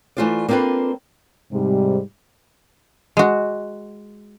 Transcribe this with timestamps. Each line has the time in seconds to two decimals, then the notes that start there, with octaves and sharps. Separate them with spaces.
0.17 E3 G#3 A3 F4 C5 D5
0.48 A#3 C4 D4 F4 A4 B4
1.52 G#2 C3 G3
3.17 G#3 F#4